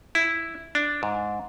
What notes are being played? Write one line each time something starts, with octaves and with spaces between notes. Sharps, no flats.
E4
D4
G#2